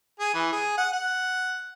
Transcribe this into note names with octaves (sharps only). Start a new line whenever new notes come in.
G#4
E3
G#4
F#5
F#5